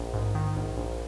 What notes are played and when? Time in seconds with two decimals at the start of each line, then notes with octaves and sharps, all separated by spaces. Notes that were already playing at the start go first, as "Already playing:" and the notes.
Already playing: A#1
0.13 G#2
0.35 D#3
0.56 A#1
0.77 A#1